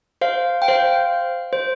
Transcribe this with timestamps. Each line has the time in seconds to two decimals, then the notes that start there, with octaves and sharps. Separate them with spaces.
0.21 C5 F5
0.62 G5
0.68 C5 F5
1.53 C5